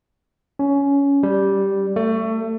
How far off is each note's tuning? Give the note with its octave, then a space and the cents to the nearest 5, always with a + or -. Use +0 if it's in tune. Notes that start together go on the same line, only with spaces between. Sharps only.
C#4 +15
G3 -5
A3 +25